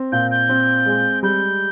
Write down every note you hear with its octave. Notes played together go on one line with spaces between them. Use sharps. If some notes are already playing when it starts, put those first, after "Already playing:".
Already playing: C4
A#2 G6
G6
C4
G#3
G3 G6